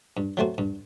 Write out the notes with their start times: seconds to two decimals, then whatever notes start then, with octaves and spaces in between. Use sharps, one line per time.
0.17 G2
0.37 F#3 A3 C4 F#4
0.58 G2